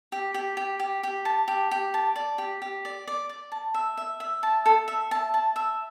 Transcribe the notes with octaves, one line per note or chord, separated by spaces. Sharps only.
G4
G4
G4
G4
G4
A5
G4
G4
A5
D5
G4
G4
D5
D5
D5
A5
E5
E5
E5
A5
A4
E5
A5
A5
E5